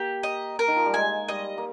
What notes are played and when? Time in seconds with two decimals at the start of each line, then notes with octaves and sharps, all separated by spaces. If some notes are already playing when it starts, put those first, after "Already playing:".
Already playing: A#3 G4
0.23 D#5
0.59 A#4
0.68 D#3
0.76 F3
0.86 G3
0.94 G#3 G#5
1.29 G3 D#5
1.58 A#3